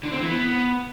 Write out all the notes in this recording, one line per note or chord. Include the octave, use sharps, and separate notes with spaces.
D3
C4
E3
B3